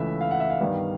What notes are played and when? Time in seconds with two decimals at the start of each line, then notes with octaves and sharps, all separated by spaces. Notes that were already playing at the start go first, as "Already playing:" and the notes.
Already playing: C#2 C#3 E3 A3 E5
0.21 F5
0.31 F#5
0.40 E5
0.50 F5
0.60 G2 D#3 G3 B3